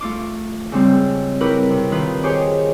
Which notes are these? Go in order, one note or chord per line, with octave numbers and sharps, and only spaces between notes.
A3 F4 D6
G#2 C#3 G3 C4
E4 F#4 G4 A#4 B4
C3
D#3 F4 B4
G4 G#4 C5 C#5 G#5